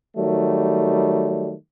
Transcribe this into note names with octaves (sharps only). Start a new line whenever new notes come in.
D#3 F#3 G3 A3